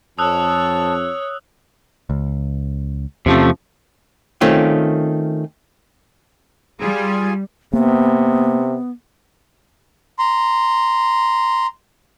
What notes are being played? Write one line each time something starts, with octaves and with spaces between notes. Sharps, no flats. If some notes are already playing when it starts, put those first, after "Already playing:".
F2 C#5 A5 D#6 E6 F#6
C#2
E2 C3 F3 A3 C#4
D#3 A3 C4 C#4 F4
G3 F4 G#4 G#5
C3 A#3 B3
A#5 C6